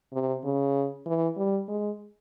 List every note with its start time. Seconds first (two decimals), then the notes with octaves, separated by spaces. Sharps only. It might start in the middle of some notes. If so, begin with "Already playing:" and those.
0.13 C3
0.44 C#3
1.06 E3
1.37 G3
1.68 G#3